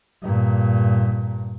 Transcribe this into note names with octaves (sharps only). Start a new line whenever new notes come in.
G2 A#2